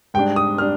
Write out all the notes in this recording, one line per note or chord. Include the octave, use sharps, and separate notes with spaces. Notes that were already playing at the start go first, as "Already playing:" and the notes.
G#2 G3 D4 G5
D#6
G3 D4 F6